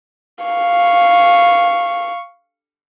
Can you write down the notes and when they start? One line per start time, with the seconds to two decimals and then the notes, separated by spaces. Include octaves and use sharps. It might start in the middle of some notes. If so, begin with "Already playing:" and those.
0.45 F5 C#6